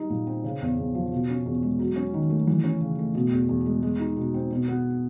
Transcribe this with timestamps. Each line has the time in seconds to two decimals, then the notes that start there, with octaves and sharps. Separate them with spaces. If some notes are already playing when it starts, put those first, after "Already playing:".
Already playing: G3 D#4
0.10 A#2
0.27 C4
0.44 C#3
0.61 E2
0.78 E2
0.95 F3
1.12 B2
1.29 C#4
1.46 E2
1.63 G#3
1.79 F#3
1.96 C#4
2.14 D#3
2.30 A3
2.47 E3
2.64 C#4
2.81 C#3
2.99 A3
3.15 B2
3.31 E2
3.49 E2
3.66 G#3
3.83 G#3
3.99 D#4
4.17 B2
4.34 C4
4.51 B2
4.68 B3